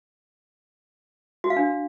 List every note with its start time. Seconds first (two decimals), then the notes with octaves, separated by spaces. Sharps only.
1.44 F#4
1.50 F5
1.56 D4